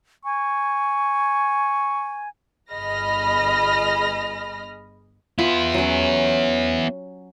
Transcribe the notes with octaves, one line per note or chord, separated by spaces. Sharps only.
G#5 C#6
G1 G#4 D#5 B5 F6 A#6
B3 E4 F4
F#3 C#4